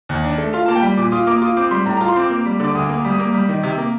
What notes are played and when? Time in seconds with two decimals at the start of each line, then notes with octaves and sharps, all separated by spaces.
0.09 D#2
0.24 D4
0.38 A3
0.53 F4 F5
0.66 A#3 A5
0.75 G5
0.82 G3
0.97 A#2 D6
1.12 F4 D#6
1.27 A#3 D6
1.42 F4 D#6
1.57 C4 D6
1.71 G3 C6
1.86 A2 A#5
1.97 A#5
2.01 F4
2.08 C6
2.16 C4 D6
2.30 A#3
2.46 G3
2.60 D3 D6
2.75 D2 D#6
2.89 A#3
3.05 G3
3.11 D#6
3.18 A#3 D6
3.34 G3
3.49 D#3
3.63 C3
3.78 A#3